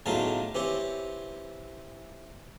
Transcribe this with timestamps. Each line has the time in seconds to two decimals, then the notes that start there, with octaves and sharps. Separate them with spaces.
0.06 B1 A2 C#3 F#3 F4 A5
0.55 E3 C4 G4 C#5